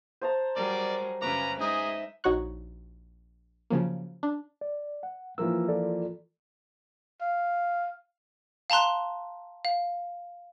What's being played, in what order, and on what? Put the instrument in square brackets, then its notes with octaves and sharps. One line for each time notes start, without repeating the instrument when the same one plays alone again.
[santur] C5 A5 A#5
[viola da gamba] F#3 G3 G#4 [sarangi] A#4 [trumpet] D5
[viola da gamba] F#2 C#3 C#4 [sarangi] B4 [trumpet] A#5 [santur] D6
[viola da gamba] G#3 D#5 [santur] D#4 [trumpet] G#4 [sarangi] E5
[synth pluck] A#1 D#4 F#4 C#5 C#6 F#6
C#3 F3 F#3 A#3
D4
[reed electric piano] D5
F#5
[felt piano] E3 F3 A#3 [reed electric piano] E6
[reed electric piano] F4 A4 D5
[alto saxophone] F5
[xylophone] F5 A5 A#5 C6 F#6
F5